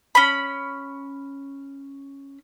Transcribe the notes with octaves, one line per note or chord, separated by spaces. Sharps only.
C#4 B5